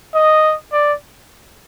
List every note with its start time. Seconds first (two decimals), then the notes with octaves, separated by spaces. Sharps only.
0.15 D#5
0.73 D5